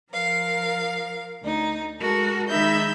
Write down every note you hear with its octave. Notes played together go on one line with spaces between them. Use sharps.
F3 A#4 F5
D2 D#4
G#3 F#4 A4 A#4
D#3 G#3 D#4 E5 B5 G6